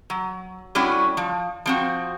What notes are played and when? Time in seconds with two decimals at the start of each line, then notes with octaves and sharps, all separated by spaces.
0.10 F#3
0.75 G3 A3 C#4 D4 E4 F#4
1.17 F3
1.66 F3 C4 F#4